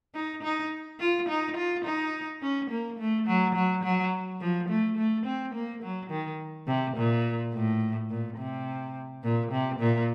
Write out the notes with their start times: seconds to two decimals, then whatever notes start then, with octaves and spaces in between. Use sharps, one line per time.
0.14 D#4
0.43 D#4
1.00 F4
1.29 D#4
1.57 F4
1.85 D#4
2.42 C#4
2.70 A#3
2.99 A3
3.27 F#3
3.55 F#3
3.84 F#3
4.40 F3
4.69 A3
4.97 A3
5.26 C4
5.54 A#3
5.83 F#3
6.10 D#3
6.67 C3
6.97 A#2
7.54 A2
8.10 A#2
8.38 C3
9.24 A#2
9.52 C3
9.80 A#2